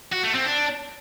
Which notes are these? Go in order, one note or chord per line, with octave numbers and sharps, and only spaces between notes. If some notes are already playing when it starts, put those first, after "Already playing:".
F#4
A3
C4
D4